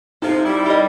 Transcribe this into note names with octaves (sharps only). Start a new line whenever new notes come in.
C3 F3 D#4 A4
G3 E4
G4 A#4 D#5